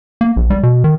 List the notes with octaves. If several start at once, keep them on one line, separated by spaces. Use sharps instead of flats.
A#3
A#1
G3
B2
D#3